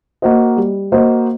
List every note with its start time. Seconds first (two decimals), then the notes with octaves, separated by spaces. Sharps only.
0.22 A#3 F#4 C5 D#5
0.57 G3
0.92 A#3 F#4 C5 D#5